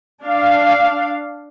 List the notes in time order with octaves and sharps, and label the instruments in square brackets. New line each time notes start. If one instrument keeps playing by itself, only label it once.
[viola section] D4 F5